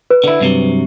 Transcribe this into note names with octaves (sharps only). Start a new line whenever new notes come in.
B4
D3 E4
G2 C3 F#3